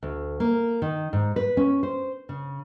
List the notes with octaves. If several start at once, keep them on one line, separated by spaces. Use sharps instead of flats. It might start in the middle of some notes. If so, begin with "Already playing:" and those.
D2
A#3
D#3
G#2
B4
C#4
C5
C#3